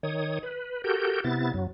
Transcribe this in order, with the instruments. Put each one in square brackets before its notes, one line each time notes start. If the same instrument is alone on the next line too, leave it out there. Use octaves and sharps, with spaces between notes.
[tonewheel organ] D#3 C#5 D#6
B4
F#4 G4 A4 A#4 G6
C3 B3 E4 A6
F#2 F#3